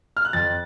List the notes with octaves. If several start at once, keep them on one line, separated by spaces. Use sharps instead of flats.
F6
F#6
F2 A6